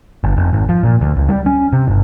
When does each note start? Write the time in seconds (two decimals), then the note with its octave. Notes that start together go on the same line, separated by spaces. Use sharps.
0.24 G1
0.37 F1
0.53 G#1
0.69 F3
0.83 A#2
1.01 D2
1.17 C#2
1.29 G3
1.46 C#4
1.73 C3
1.88 G1